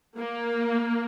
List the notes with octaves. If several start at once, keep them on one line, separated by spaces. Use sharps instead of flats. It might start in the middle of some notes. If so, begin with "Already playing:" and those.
A#3